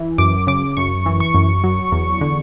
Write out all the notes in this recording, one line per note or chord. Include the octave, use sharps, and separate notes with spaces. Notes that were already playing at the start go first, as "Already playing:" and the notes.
Already playing: E3
F#2 D6
C#3 D6
F#2 C#6
E3
C#6
F#2
F#3
E2
D3